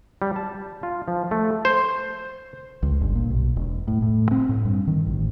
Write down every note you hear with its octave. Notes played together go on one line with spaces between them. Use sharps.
G3
A5
F4
F3
A3
C5
C#2
G1
A#2
B1
E1
A2
A2
C4
A2
G2
D#3
A1